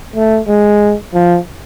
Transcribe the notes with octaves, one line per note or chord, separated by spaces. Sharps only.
A3
G#3
F3